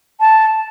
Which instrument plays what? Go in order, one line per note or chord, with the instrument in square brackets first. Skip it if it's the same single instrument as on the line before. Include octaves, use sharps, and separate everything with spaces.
[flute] A5